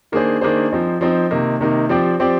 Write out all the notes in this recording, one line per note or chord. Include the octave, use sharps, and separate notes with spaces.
D#3 A#3 D4 G#4 C5
D#3 A#3 D4 G#4 C5
F3 C4 D#4
F3 C4 D#4
C3 D#3 A#3 D#4
C3 D#3 A#3 D#4
F3 C4 G4 D5
F3 C4 G4 D5